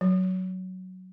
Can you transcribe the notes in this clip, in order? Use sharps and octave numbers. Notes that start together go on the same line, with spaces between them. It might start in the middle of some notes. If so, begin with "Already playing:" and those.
F#3